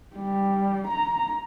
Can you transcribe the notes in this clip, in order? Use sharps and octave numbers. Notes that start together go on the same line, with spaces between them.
G3
A#5